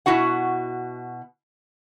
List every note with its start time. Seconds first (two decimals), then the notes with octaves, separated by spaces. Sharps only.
0.06 B2 E4 F#4 F#5